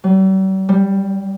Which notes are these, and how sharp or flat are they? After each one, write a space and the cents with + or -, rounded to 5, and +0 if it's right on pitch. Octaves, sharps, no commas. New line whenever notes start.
G3 -45
G3 +5